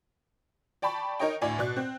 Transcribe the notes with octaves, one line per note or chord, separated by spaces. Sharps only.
D5 G5 A5 B5 C#6
D#4 A#4 C#5 D#5 G5
D2 A2 D5 G#5
B2 D5 F#6
C4